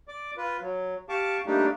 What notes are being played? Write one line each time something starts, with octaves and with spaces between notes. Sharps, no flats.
D5 D6
F4 B4
F#3
G4 F5 A5 C#6 D6
G3 A3 A#3 D4 D#4 G4